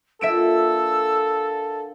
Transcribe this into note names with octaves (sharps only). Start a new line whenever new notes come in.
A#2 D3 A4 E5 E6 D7 E7